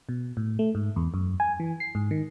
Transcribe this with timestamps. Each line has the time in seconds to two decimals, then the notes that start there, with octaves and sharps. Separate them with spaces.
0.09 B2
0.37 A2
0.59 A3
0.75 G#2
0.96 E2
1.14 F#2
1.40 G#5
1.60 E3
1.80 C7
1.95 G#2
2.11 D#3